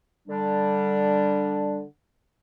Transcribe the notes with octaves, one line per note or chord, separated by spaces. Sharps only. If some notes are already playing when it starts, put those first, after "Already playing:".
D3 G3 D4